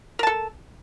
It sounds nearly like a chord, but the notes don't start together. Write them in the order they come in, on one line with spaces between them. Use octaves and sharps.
A#4 A5 A4